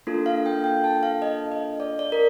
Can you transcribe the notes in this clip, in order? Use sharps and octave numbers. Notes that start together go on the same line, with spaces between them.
A#3 D4 F4 A4
F5
G5
G5
A5
F5
D#5
D#5
D5
D5
A#4